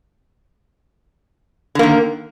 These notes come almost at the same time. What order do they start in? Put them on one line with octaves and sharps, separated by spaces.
D3 A#3 D#3